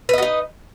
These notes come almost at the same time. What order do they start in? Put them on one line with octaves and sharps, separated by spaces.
B4 D#5 F#4 D#4